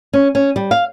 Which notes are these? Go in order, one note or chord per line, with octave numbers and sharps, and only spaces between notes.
C#4
C#4
G3
F5